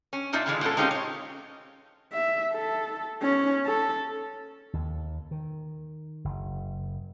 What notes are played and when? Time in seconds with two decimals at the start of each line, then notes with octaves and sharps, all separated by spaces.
0.13 C#4
0.33 A#2 D4 D#4 F4 D5 E5
0.46 A#2 D3 E3 F3 G#3 F4
0.61 A#2 G#3 B3 C#4 A4
0.77 G#3 C4 C#4 D#4 F4 G4
0.91 C5 C#5
2.13 E5
2.53 A4
3.22 C#4
3.66 A4
4.73 D#2
5.31 D#3
6.24 F#1